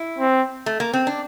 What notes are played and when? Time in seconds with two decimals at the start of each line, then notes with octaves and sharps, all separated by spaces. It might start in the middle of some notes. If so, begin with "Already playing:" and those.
Already playing: E4
0.18 C4
0.66 A3
0.80 A#3
0.94 C4
1.07 D4